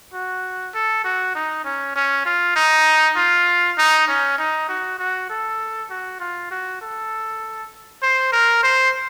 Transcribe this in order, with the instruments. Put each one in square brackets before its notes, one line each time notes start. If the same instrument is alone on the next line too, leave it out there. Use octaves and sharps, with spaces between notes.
[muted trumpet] F#4
A4
F#4
D#4
C#4
C#4
F4
D#4
F4
D#4
C#4
D#4
F#4
F#4
A4
F#4
F4
F#4
A4
C5
A#4
C5